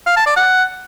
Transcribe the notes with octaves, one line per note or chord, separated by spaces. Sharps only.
F5
A5
D5
F#5